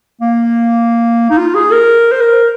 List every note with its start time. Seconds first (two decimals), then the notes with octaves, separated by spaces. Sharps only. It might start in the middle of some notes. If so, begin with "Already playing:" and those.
0.21 A#3
1.30 D#4
1.38 F4
1.55 G#4
1.71 A#4
2.12 C5
2.21 A#4